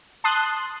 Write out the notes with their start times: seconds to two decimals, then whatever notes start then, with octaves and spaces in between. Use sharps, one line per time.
0.24 A5 C6 D#6 F#6